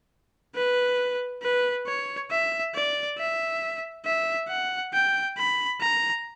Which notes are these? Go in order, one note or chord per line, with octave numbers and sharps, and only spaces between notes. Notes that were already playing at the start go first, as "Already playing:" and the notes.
B4
B4
C#5
E5
D5
E5
E5
F#5
G5
B5
A#5